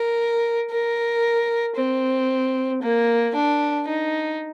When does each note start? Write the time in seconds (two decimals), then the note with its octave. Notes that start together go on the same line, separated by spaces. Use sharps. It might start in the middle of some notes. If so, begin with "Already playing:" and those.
Already playing: A#4
0.70 A#4
1.76 C4
2.82 A#3
3.35 D4
3.88 D#4